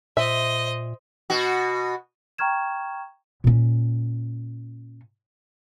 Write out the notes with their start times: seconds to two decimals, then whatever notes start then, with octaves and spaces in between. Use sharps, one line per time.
0.17 A#2 C5 D#5 E5
1.30 B2 F#4
2.38 G5 A#5 C#6 F6 G#6 E7
3.44 A#2 C#4